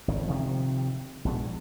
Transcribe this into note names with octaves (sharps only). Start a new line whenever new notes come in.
G#1 C#3
C3 D#3 F3
A#1 B2 G#3